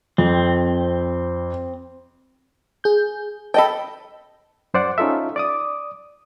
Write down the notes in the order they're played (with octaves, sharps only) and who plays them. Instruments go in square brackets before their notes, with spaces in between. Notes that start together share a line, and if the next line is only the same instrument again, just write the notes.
[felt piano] F2 [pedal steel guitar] C4
[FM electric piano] G#4 G6
[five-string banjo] A4 D#5 G5 [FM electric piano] A5 B5
[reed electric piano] F#2 C5 D5 F#5
C#4 D#4 F4 A4 E5
D5 D6 D#6